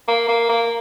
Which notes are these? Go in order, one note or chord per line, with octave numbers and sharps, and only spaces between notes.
A#3
A#3
A#3